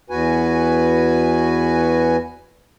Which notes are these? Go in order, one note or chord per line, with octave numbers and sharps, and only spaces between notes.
E2 F#4 B4 G#5